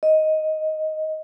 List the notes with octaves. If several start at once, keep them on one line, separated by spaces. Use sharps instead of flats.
D#5